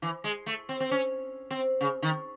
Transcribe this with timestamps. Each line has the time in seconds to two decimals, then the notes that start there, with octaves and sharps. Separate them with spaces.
0.02 E3
0.24 G#3
0.46 A3
0.69 C4
0.80 C4
0.91 C#4
1.51 C4
1.81 C#3
2.02 D#3